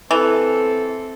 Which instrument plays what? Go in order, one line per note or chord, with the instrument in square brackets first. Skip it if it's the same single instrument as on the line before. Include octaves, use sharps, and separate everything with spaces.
[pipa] E3 [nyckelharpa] C4 A4